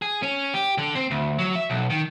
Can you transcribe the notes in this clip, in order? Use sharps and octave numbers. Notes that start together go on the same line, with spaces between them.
G#4
C#4
G4
D3
C4
D2
F#3
E5
B1
D#3